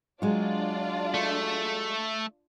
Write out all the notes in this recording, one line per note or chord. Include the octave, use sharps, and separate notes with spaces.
F#3 G#3 D4 F4 F#4 D5
A3